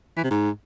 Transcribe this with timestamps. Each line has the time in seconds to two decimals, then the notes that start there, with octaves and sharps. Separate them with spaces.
0.17 E3
0.24 C3
0.31 G#2